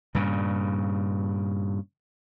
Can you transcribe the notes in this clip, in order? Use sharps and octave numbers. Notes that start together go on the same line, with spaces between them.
G2 A#2 C#3